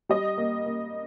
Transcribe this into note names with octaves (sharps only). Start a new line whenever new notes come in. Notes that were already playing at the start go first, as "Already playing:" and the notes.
G3 D#5
A#3
A#3